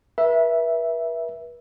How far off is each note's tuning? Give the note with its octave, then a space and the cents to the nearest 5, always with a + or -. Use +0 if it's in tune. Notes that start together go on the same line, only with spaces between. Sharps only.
B4 -40 E5 +0